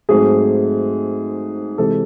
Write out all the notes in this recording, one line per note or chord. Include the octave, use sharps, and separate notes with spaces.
G#2 F#3 A3 C4 G#4
C3 E3 G#3 C4 A4